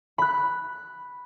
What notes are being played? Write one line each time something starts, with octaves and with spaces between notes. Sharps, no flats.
B5 F#6